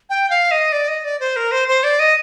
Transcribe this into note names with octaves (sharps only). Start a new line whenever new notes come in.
G5
F5
D#5
D5
D#5
D5
C5
A#4
C5
C5
D5
D#5